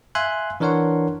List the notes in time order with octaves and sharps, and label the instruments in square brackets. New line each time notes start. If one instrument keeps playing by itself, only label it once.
[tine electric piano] E5 F5 G#5 C6 F#6
E3 D4 A#4 C#5 F#5 C6